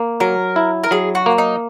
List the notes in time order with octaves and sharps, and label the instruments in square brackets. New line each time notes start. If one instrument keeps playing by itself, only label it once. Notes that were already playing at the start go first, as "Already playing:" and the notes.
Already playing: [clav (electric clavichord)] A#3
[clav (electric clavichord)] F#3 [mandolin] A#4
[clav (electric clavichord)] E4
[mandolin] A#4
[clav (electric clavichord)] F#3 [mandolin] G#4
[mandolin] F#4
[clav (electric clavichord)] A#3
[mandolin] D#4